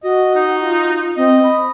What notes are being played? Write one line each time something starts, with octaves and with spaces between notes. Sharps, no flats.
F#4 D#5
D#4
F4
C4 D#5
B5